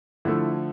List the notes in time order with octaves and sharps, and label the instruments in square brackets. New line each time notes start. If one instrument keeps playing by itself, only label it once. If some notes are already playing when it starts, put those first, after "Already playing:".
[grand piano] D3 F3 A3 E4